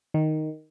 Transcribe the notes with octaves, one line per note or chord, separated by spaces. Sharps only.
D#3